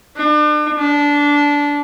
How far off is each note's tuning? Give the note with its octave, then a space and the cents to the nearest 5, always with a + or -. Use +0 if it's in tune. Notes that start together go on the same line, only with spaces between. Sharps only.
D4 +40
D4 -15